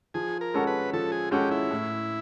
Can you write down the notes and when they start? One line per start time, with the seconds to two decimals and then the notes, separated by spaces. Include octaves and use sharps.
0.14 F3 G#4
0.41 A#4
0.54 G#3 C#4 F#4 A4
0.67 B4
0.93 F3 A4
1.12 G#4
1.31 G#3 C#4 F#4 G4 A4
1.51 E4
1.71 A2